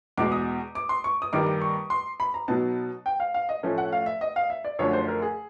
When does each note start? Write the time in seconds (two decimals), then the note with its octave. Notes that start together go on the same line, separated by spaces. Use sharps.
0.17 E2 B2 G#3 D6
0.32 D#6
0.75 D6
0.89 C6
1.04 C#6
1.22 D#6
1.33 G2 D#3 G3 A#3 D6
1.46 D6
1.61 C#6
1.90 C6
2.20 B5
2.34 A#5
2.48 B2 F#3 B3 D#4 A5
3.06 G5
3.20 F5
3.34 F5
3.49 D#5
3.63 A2 F3 A3 C#4 E4
3.78 F#5
3.92 F5
4.06 E5
4.21 D#5
4.36 F5
4.50 E5
4.64 D5
4.79 F#2 D3 F3 A3 D4 C#5
4.93 C5
5.08 A#4
5.22 G#4